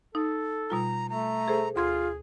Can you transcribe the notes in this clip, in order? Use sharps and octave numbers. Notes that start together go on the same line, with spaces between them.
D#4 A4
B2 G3 F4 A#5
A3 A#5
G#4 A4 C5
D2 F4 G#4 C6 G#6